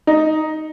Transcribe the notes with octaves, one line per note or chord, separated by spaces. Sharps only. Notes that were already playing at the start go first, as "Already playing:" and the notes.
D#4